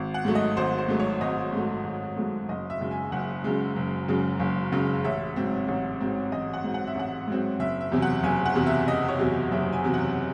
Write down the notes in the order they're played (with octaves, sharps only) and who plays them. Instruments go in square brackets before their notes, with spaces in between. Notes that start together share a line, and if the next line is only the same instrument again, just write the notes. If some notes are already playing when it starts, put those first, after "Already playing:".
Already playing: [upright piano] G#1
F#5
G#2 F#3 A3
D#5
G#1 C5
C5
G#2 F#3 A3
C#5
G#1 D#5
G#2 F#3 A3
G#1
G#2 F#3 A3
F#1 D#5
E5
F#2 C#3 G#3
G#5
F#1 F#5
F#2 C#3 G#3
F#1
F#2 C#3 G#3
F#1
F#2 C#3 G#3
A1 E5
G#2 F#3 C4
A1
G#2 F#3 C4
A1 D#5
F#5
G#2 F#3 C4
F#5
E5
A1 F#5
G#2 F#3 C4
F#1 E5
E5
E2 C3 F#3
F#5
F#1 G#5
F#5
E2 C3 F#3
E5
F#1 D#5
C#5
E2 C3 F#3
F#1 E5
G#5
E2 C3 F#3
F#5